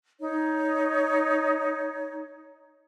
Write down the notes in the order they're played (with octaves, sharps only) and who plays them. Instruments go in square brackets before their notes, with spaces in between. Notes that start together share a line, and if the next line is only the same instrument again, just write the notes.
[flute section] D#4 C#5